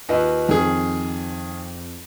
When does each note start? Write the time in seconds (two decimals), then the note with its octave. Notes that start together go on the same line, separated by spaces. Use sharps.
0.09 D#2 F4 B4 D#5
0.49 F2 D#3 G#4